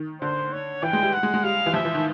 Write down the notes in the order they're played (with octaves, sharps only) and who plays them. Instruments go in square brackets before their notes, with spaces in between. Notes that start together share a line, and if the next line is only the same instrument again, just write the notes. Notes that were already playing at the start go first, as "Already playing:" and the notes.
Already playing: [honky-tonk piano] D#3
[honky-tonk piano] D3 [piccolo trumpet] C5
[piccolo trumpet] C#5
[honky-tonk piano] E3 [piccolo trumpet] G5
[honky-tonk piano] G#3
G3
[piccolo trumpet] F#5
[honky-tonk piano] G#3
G#3
[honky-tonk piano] G3 [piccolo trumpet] F5
[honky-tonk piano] E3
[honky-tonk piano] F3 [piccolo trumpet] E5
[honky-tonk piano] E3
D#3